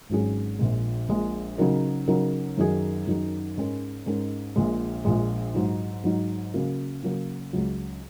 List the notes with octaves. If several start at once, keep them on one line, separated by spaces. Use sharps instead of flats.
G#1 G#2 F#3 C#4 G#4
A#1 A#2 G#3
A#1 A#2 G#3
C#3 F#3 D#4 A#4
C#3 F#3 D#4 A#4
F#2 D#3 F#3 D#4 G#4
F#2 D#3 F#3 D#4 G#4
G#2 G#3 C#4 A#4
G#2 G#3 C#4 A#4
A#1 A#2 G#3
A#1 A#2 G#3
G#2 F#3 D#4
G#2 F#3 D#4
C#3 F#3 A#3 F#4
C#3 F#3 A#3 F#4
C#2 C#3 F#3